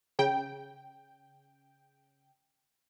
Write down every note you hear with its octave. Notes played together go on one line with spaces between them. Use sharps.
C#3 G5